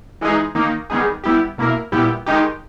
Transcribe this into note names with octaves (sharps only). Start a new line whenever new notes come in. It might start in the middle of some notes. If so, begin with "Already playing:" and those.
E3 G#3 D#4 G#4
D#3 A#3 D#4
D#3 G3 B3 D#4 G#4
G3 B3 E4 G4
B2 A#3 E4 A#4
A#2 G3 B3 E4 G4
D#3 G#3 D#4 G4